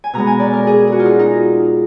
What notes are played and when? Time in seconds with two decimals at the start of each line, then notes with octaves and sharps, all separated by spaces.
0.04 G#5
0.13 B2 G#3 B3 A#5
0.27 G#5
0.40 D5
0.53 A#4
0.67 G#4
0.87 G#4
0.92 F#4
1.00 F4
1.06 D#4
1.19 D#4